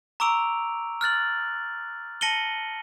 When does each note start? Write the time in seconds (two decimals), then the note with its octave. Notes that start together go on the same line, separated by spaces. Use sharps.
0.20 A#5 C#6 D6 E6 D7 F7
1.01 F6 F#6 A6 F#7
2.21 A5 A#6 C#7 D#7 F#7 G7